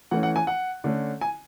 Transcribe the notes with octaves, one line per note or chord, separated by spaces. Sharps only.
E3 A3 C#4 F#5
F#5
G#5
F#5
D3 A3 C#4
G#5